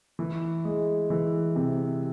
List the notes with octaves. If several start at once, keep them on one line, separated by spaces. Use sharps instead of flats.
E3
G#3
E3
C3